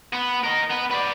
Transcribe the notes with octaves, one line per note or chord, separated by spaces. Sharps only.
B3
A#4 D#5
B3
B4 D5